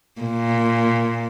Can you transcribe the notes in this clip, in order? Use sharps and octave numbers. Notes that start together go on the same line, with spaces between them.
A#2